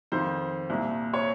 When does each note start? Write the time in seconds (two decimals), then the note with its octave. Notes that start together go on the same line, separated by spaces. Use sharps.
0.12 F2 D#3 C5
0.70 C2 A#2
1.13 C#5